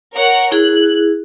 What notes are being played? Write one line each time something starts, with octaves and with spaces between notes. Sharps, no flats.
A#4 C#5 F#5
E4 G#4 F#6